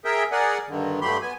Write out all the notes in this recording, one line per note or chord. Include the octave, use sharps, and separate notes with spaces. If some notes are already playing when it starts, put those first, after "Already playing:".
G#4 A#4 E5 G5
G#4 A#4 D5 F#5 G#5
G2 D3 D#3
G2 F#3 A3 G4 B5 C6
B3 G#5